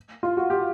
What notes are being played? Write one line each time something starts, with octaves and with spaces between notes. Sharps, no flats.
F4
F#4
G4